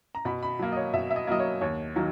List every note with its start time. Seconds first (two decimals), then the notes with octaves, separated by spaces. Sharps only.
0.15 A#5
0.25 B2 B5
0.43 B5
0.59 F#3 A#3
0.72 D#5
0.77 C#5
0.93 B2 E5
1.11 E5
1.16 D#5
1.27 F#3 A#3 D#5
1.40 C#5
1.61 D#2 C#5
1.96 D#3 F#3 A#3